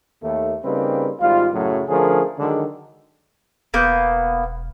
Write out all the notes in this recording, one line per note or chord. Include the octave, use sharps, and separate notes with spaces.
D#2 A3
C#3 G3 A#3 C4 D#4 B4
G#1 G#2 G3 F4
F#2 A2 C#3 F#3
D3 F3 A3 C#4 G#4 A#4
D3 D#3 F#3 G#3
E1 A#3 B3 G6